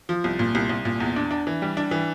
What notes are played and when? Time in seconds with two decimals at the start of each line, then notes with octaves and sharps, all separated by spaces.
0.09 F3
0.24 C2
0.39 A#2
0.55 C2
0.70 C2
0.85 A#2
1.00 E2
1.16 D4
1.31 D4
1.47 E3
1.62 G3
1.77 D4
1.91 E3